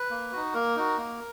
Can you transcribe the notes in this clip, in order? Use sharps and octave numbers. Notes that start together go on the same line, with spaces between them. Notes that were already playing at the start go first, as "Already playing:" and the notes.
Already playing: B4
A#3
D#4 F#4
A#3 A#4
D#4 F#4
A#3